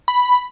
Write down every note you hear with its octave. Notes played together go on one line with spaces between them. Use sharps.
B5